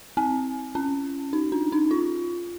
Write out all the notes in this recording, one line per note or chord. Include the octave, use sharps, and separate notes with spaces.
C4
C#4
D#4
D4
D#4
F4